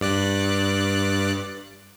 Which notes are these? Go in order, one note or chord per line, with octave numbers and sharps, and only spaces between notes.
G2 D5 F#6